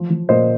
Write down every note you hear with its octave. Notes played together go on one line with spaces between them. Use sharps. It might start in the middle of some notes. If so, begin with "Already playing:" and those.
Already playing: F3
F3
A#2 C5 D#5